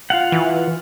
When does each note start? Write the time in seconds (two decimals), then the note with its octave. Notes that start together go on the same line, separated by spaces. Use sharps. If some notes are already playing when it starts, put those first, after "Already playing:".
0.10 F4 F5 F#5
0.32 E3